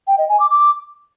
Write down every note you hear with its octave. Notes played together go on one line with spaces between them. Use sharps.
G5
D#5
G#5
D6
D6